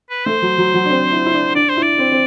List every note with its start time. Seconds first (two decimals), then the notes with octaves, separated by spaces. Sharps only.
0.10 B4
0.26 A3 C5
0.42 F#3
0.58 F#3
0.74 F#3
0.85 D4
0.90 C4
1.12 E4
1.26 E4
1.34 D4
1.55 D4 D5
1.69 C5
1.77 E4
1.83 D5
1.98 C4
2.12 C4